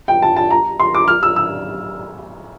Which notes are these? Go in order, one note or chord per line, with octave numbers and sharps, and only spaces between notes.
G5
A5
A5
A#5
C6
D6
F6
E6
E6